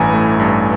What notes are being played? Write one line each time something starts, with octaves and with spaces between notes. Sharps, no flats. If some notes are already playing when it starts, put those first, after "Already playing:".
Already playing: A1 G2 E3 A3 G#5 A#5 B5
A3
G2